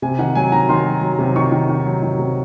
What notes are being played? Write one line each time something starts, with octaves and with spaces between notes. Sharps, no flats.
C3 G#5
D#3 F#5
F#3 G#5
D#3 A#5
D#3 C6
F#3
F#3
C3
D#3 C#6
D#3
D#3
F#3
D#3
C3